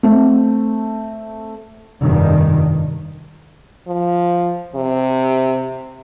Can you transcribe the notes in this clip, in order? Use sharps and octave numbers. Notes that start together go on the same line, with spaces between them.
A3 C4
F1 G2 D#3
F3
C3